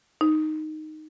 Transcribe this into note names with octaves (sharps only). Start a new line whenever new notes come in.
D#4